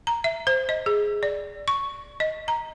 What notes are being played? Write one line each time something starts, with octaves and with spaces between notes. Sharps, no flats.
A#5
E5
C5
D#5
G#4
D5
C#6
D#5
A#5